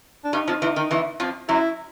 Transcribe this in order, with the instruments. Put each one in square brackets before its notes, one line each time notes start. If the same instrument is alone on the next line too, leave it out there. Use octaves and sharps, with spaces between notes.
[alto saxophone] D4
[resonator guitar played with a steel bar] G2 G3 [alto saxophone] D#4
[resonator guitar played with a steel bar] F2 F3
E2 E3
D#3
E2 E3
F2 F3
[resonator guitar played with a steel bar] F#2 F#3 [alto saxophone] E4